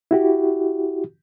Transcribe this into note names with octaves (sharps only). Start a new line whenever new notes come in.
E4 F#4 G4